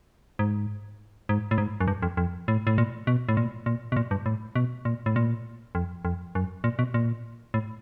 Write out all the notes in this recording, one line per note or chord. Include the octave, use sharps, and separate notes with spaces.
G#2
G#2
A2
G#2
F#2
G2
F2
F2
A2
A2
A#2
B2
A2
A#2
A#2
B2
A#2
G2
A2
B2
A#2
A2
A#2
F2
F2
F#2
A#2
B2
A#2
A2